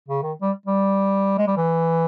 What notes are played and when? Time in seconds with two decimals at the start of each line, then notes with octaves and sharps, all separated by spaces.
0.08 C#3
0.23 D#3
0.41 G3
0.66 G3
1.38 G#3
1.47 G3
1.57 E3